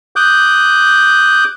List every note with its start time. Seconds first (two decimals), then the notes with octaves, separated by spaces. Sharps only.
0.16 D6 D#6 F#6 G6